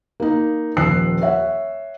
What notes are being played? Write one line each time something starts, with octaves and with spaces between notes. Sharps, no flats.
A#3 D#4
D#1 F3 E6 F#6 C7
C#5 E5 F#5